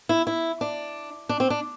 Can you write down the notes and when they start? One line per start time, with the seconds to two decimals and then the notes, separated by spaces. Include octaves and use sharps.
0.09 E4
0.27 E4
0.61 D4
1.29 D4
1.40 C4
1.50 D4